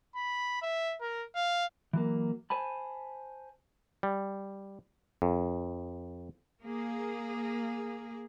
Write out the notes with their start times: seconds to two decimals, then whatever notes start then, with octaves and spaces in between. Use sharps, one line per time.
0.15 B5
0.62 E5
1.01 A#4
1.35 F5
1.93 E3 F#3 A#3
2.50 C5 G#5 A5 B5
4.03 G3
5.22 F2
6.65 A#3 G#4